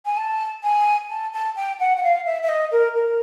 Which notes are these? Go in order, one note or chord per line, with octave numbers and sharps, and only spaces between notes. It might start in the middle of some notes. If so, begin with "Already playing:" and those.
G#5
A5
G#5
A5
A5
G5
F#5
F#5
F5
E5
E5
D#5
A#4
A#4